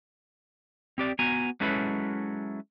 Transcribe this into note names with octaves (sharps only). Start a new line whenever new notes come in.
C4 G4 D5
B3 F#4 G#5 A#5
F#3 G#3 C#4 E4 A4 B4